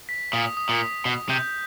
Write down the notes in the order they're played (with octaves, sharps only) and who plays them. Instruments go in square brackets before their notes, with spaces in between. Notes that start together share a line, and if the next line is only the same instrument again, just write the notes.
[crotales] B6
[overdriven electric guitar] A#2 [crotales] D#6
[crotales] D#6
[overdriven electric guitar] A#2
[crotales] B6
[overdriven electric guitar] B2 [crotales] D#6
[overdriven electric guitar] C3 [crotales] G6